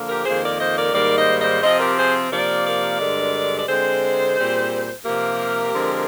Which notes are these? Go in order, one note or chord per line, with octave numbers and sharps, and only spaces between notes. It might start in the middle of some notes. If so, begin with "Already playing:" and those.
Already playing: D3 F3 A#3
G4 A#4
F2 D#3 A#3 G#4 C5
A#4 D5
C5 D#5
A#4 D5
G#2 D#3 G3 A#3 A#4 D5
C5 D#5
C5 D#5
C3 F3 C4 C5 D#5
G4 A#4
G#4 C5
C3 F3 A#3 A#4 D5
A#4 D5
G2 D3 G#3
D5
D3 G#3 C4 G#4 C5
A#2 G3 C4
C3 F3 A#3 G4 A#4
D3 F3 G#3 C4